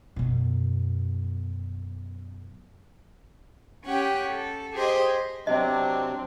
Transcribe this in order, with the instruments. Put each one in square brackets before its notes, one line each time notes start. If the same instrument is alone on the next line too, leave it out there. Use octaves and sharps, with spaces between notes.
[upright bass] F#2 B2
[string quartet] C#4 G4 F#5 G5
A4
G4 G#4 C5 D#5
[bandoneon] C3 F#3 D4 [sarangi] C4 [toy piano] D#5